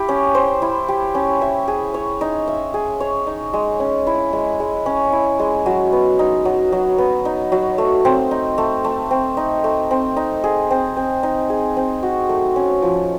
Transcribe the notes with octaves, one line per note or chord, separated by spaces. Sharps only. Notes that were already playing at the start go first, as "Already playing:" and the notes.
Already playing: E4 G4
C#4
C5
E4
G4
C#4
E5
G#4
C#5
D#4
E5
G#4
C#5
D#4
G#3
C#4
E4
G#3
G#3
C#4
E4
G#3
F#3
B3
D#4
F#3
F#3
B3
D#4
F#3
A3
C4
D#4
A3
A3
C4
D#4
A3
C4
D#4
G#4
C4
C4
D#4
G#4
C4
F#4
A3
C#4
F3